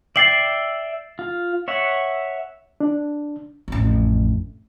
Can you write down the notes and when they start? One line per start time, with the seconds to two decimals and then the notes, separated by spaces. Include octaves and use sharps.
0.16 D5 E5 G5 A6 C7 F#7
1.19 F4
1.68 C#5 E5 F#5
2.80 D4
3.68 A1 F2